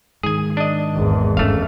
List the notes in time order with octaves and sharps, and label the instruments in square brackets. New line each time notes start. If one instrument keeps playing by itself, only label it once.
[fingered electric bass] G#2 D#3 [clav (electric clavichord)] G#4 G#5
[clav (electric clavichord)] D4 D#5
[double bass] G#1 E2
[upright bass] G2 C#4 [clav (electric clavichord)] A3 F5